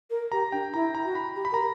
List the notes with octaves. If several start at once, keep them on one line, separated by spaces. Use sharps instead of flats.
A#4
G4 A#5
D4 G5
E4 A#5
A#5
F#4
B5
G4
B5
A#4 A#5